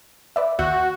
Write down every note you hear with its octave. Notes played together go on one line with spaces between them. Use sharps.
B4 D5 E5
D#2 F#4 E5 G6